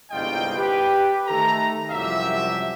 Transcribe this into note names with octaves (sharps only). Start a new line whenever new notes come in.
G1 C2 G#2 F4 D#5 G5
G4 B4
D#3 A3 A4 A#5
C2 F#2 F3 G4 E5